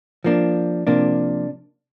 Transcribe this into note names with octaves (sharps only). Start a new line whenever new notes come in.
F3 A#3 D4
C3 F3 A#3 D4